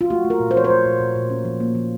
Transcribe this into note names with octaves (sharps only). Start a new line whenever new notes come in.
F4
A3 F#4
A3
A#4
A#2
C5
F3 C#5
C5
A3
A#2
A#2
A#2
C#4
F3
A#3
F3